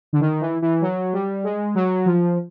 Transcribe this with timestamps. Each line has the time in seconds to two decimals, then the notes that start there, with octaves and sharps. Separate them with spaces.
0.13 D3
0.21 D#3
0.41 E3
0.62 E3
0.82 F#3
1.13 G3
1.44 G#3
1.75 F#3
2.06 F3